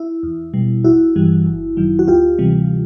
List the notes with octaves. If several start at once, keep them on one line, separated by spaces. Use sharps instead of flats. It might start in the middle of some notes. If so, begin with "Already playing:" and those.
Already playing: E4
E2
B2 G3
A1 E4 F#4
G2 E3 G3
G1
F#2 D#3 F#3
F#4
D2 F4 G4
C3 E3 G3